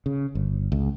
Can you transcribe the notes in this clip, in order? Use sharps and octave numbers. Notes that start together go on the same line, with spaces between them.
C#3
G1
C#2